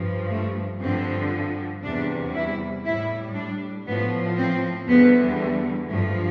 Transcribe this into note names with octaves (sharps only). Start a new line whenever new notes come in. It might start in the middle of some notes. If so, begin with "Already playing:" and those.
Already playing: G2 F3
A3
G2 D3 F3 C4
E2 C3 G3 D4
E4
A2 G3 E4
D4
A2 F3 B3
C4
E2 D3 G3 B3
A3
G2 F3 A3